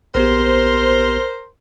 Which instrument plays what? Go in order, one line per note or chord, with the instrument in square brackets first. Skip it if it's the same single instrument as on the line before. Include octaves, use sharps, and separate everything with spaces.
[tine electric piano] A#1 B3 G4 [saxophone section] A#4 C5